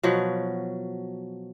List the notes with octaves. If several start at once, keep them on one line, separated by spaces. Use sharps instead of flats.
B2 F3 F#3